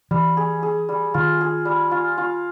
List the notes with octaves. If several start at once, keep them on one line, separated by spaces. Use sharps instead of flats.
E3 G3
G#4
G#4
G3
D#3 F4
G#4
G3
F4
F4